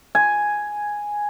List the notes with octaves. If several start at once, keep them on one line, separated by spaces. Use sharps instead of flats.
G#5